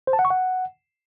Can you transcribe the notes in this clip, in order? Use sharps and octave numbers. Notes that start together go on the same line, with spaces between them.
C5
A5
F#5
C#6
F#5